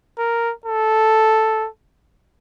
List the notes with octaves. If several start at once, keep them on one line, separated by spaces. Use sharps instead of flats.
A#4
A4